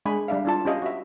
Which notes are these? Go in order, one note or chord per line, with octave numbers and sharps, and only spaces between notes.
G#3 D4 G#5 B5
G3 D4 E5 F5
D4 E4 F4 A5
C#4 G4 D#5 F5
F#4 E5